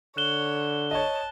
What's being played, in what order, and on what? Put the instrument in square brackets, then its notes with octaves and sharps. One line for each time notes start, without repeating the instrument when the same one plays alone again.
[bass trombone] D3 [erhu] C#5 [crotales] F#6 E7 G7
[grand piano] C#5 D#5 [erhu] A5